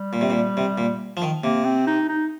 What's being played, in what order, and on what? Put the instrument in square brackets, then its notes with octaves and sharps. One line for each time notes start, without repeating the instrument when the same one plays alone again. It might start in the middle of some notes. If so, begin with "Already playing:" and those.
Already playing: [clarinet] G3
[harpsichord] A#2
C3
A#2
C3
A#2
F3
D#3
[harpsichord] C3 [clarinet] A#3
[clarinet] C4
D#4
D#4